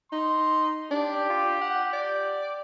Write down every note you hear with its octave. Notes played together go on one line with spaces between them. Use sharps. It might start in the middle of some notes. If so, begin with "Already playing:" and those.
D#4 C6
D4 G4
F4
F#5
D5